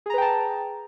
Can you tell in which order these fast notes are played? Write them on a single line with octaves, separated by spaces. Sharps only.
G#4 A#5 B4 G5 A5